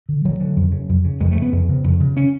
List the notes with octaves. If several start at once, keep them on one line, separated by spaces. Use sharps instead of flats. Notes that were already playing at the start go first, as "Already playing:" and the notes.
D3
D2 F#3
D3
F2
C#3
F2
C#3
F2 G#3
A3
C#3
B3
F2
C#3
F2
C#3
C#4